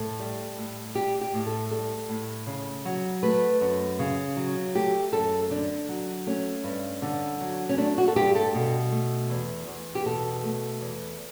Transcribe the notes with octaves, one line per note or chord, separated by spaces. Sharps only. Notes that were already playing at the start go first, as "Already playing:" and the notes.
Already playing: A2 A4
G3
A2
G3 G4
G4
A2
A4
G3 A4
A2
C#3
F#3
A3 B4
F#2
C#3
F#3
A3 G4
F#2 A4
D3 D4
F#3
A3 C#4
G2
D3
F#3
C#4
A3 D4
F#4
A4
G2 G4
A4
B2
A3
E2
E2
G4
B2 A4
A3
E2